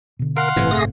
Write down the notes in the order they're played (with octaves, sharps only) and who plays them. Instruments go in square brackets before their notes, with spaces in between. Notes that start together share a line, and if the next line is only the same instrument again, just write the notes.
[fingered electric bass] B2 D3
[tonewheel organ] A#4 [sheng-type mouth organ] F5 F#5 C6
[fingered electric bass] G1 C4 [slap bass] A2 C3 [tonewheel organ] E3
[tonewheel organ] A3 G#4 A#6